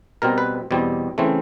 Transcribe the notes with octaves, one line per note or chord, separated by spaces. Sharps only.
B2 G3 C4 A#4
B4
E2 B2 G3 C4
C#3 E3 A3 C4